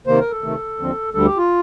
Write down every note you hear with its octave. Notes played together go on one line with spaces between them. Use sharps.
C3 D#3 A#3 C5
A#4
A4
C3 D#3 A3
D#2 D3 F3 C4
D2 D3 G3 A4
G4
F4